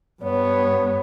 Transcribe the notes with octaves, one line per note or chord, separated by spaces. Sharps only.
G2 B3 C#5